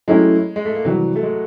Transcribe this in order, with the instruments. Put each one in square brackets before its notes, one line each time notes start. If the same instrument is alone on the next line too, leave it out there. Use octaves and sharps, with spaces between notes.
[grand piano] F#3 A3 C#4 E4 G4 [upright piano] G#3
[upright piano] G#3
A3
A#3
[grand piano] C3 E3 G3 [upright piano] F#3
[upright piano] A3
G#3